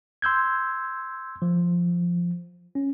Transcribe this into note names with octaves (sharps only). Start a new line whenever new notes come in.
C6 E6 G6 G#6
F3
C#4